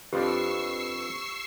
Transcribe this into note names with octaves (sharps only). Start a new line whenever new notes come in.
F2 F3 D4 G4 B4 C#6 E6 C7